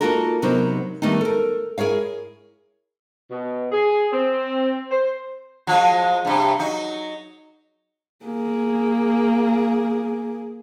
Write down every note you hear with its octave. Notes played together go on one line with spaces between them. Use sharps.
A#3 D#4 F4 F#4 A4 A#4
C3 F#3 B3 D#4 A#4 C5
D#3 G3 A3 B3 D#4
A4 A#4
E4 G#4 A#4 C#5 F5
B2
G#4
C4
C5
F3 F#3 G#3
G2 C3
F#3 D#4
A#3 G#4